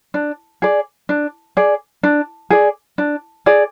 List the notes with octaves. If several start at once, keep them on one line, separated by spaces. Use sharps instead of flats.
D4
G#4 D5
D4
G#4 D5
D4
G#4 D5
D4
G#4 D5